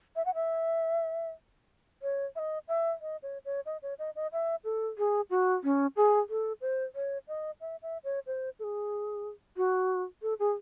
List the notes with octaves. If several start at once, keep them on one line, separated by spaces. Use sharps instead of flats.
E5
F#5
E5
C#5
E5
D#5
E5
D#5
C#5
C#5
D#5
C#5
D#5
D#5
E5
A4
G#4
F#4
C#4
G#4
A4
C5
C#5
D#5
E5
E5
C#5
C5
A4
G#4
F#4
A4
G#4